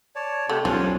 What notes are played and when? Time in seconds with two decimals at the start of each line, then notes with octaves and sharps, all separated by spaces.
0.16 C#5 D5 A5
0.50 C3 A3 G4 F#5 B5
0.65 B1 G2 F3 C#4 D4